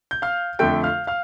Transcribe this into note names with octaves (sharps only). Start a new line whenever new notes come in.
G6
F5 F6
F2 D3 A3 G5 G6
F5 F6
F5 F6